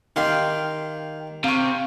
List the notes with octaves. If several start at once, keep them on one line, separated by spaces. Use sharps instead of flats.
D#3 G4 F5 G5 C6
C3 F5 C#6